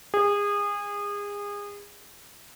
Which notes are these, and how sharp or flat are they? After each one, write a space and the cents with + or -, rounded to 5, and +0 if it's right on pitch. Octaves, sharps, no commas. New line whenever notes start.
G#4 -30